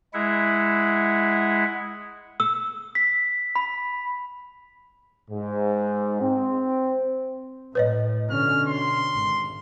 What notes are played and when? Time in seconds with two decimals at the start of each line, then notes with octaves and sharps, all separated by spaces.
0.14 G#3 E4 E5 F#5
2.40 E6
2.95 B6
3.56 B5
5.31 G#2
6.22 C4
7.75 A2 B4 C#5 D#5
8.30 B2 D3 C#4 F6
8.68 C6
9.13 G#1